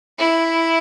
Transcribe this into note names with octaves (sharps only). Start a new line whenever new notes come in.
E4